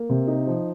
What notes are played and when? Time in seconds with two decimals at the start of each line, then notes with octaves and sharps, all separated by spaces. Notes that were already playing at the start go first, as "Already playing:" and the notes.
Already playing: A#3
0.09 C3
0.28 D#4
0.47 F3